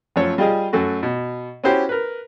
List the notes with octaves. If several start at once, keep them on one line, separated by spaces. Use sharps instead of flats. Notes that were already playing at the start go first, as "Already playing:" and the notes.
F#2 F3 A3 A4 C#5
G3 F4 G4 G#4 D#5
F#2 A3 F#4
B2
C#4 E4 F#4 G4 C5
A#4 B4